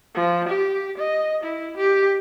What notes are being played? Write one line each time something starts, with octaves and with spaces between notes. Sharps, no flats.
F3
G4
D#5
E4
G4